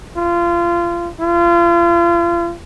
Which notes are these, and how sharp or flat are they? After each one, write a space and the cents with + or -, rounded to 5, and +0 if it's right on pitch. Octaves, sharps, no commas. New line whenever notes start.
F4 -25
F4 -35